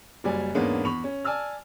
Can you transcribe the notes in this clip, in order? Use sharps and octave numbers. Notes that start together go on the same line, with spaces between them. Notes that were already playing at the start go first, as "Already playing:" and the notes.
F#1 F#3 G3 D5 G#5
E2 G#2 A#3 B3 C#4 D4
E2 B5 C#6 F7
C#4
D5 G#5 A5 E6 F6